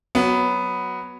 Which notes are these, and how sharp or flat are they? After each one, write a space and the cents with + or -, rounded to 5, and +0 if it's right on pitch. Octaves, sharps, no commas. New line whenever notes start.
F#3 +0 B3 +0